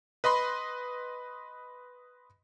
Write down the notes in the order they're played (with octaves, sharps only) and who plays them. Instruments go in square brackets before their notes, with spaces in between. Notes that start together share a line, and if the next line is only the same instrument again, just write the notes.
[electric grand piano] B4 D#5 B5 C6